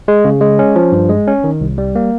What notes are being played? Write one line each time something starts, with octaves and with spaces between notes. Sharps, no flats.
G#3
C#3
G#3
C#4
F3
G2
G#3
C#4
D#3
C2
G3
A#3